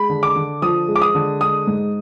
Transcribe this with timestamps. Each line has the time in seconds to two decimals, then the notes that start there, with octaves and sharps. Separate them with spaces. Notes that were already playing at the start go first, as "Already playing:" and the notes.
Already playing: G#3 B5
0.10 D3
0.23 D6
0.36 D3
0.62 F3 D#6
0.88 G#3
0.96 D6
1.02 D#6
1.15 D3
1.41 G#3 D#6
1.67 G#2